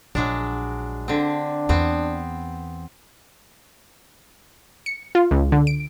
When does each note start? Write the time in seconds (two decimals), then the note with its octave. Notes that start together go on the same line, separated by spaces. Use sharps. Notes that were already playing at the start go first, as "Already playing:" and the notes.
0.15 A#1 F#3 G#3 D4
1.08 D3 C4 D4
1.69 E2 B3 C4
4.86 C#7
5.15 F4
5.31 C#2
5.52 D3
5.67 D7